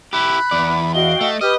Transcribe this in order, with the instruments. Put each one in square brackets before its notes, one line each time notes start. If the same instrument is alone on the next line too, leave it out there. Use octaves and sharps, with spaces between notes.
[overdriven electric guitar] E4 G4 [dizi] B5 [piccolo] F#6
[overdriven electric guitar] E2 D5
[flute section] F#4 F5 G5 [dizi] D#5 [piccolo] G7
[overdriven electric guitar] A3 [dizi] D#5
[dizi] G4 [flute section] B4 G5 D#6 [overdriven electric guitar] D#5 [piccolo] F6